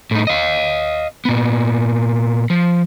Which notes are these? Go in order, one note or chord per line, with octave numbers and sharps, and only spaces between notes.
A2 D#4
D#5 F5
A#2 B3
F3